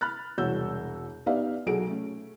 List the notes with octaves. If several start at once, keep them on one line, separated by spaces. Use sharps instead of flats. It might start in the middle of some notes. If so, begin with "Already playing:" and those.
B5 F6 F#6 A6
E1 C2 F#4 C#5 E6 G6
B3 D#4 G4 D5 E5 F5
B1 F#4 G#4 A4 D7
A3 C#4